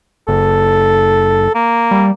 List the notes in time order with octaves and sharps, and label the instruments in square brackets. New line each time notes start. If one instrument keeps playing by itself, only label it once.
[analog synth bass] F#1 [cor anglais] A4
[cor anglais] A#3
[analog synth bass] G3